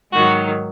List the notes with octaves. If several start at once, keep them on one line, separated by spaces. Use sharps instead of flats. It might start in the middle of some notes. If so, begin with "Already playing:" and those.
G#2 D#3 F#3 F#4